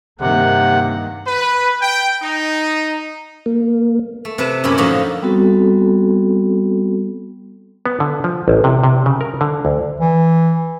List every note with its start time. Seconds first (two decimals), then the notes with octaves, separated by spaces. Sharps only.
0.20 G2 C3 D#3 A#3 F#5
1.26 B4
1.80 G5
2.22 D#4
3.46 A#3
4.25 A3
4.38 C3 B4 A5
4.64 F#2 A#2 C#4 E4 G4 B5
4.78 A2 D3 F3 D#4 F#4
5.22 G3 B3 C4 F#4 A4
7.86 B3
8.00 D3
8.24 F3
8.48 A1
8.64 C3
8.84 C3
9.06 C#3
9.21 A#4
9.41 D3
9.65 D2
10.00 E3